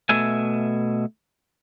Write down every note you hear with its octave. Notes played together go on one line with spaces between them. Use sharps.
B2 A3 E5 G#5